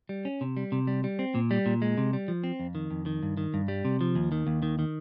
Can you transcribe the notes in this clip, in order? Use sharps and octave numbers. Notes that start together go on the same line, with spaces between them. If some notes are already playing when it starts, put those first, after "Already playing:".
G3
C#4
C3
G3
C3
G3
G3
C4
A#2
G3
A#2
G#3
C3
G3
F3
C4
F2
D#3
F2
D#3
G2
D#3
G2
G3
C3
F3
D#2
D#3
D#2
D#3
D#3